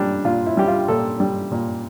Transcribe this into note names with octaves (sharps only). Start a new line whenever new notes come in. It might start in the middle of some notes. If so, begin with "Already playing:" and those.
Already playing: A#2 G3 D4
A#2 F4
E4
G3 G4
F4
A#2 A4
G3
A#2